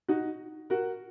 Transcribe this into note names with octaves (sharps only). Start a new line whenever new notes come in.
D#4 F#4
F#4 A#4